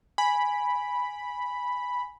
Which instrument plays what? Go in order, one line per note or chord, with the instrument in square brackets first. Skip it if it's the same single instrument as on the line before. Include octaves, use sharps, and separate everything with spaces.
[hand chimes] G#5 [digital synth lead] B5